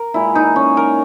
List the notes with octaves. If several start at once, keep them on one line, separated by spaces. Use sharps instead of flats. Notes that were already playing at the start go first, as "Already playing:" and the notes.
Already playing: A#4
A#2 G#3 E4
D#4
C#4
A#4